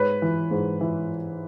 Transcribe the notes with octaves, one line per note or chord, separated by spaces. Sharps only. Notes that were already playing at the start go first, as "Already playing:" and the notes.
Already playing: G#2 B4 C#5
E3
G#2
E3